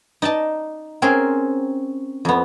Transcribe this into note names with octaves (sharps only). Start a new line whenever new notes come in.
D#4 D5 D#5 A5
C4 C#4 G#4 A#4
F2 B3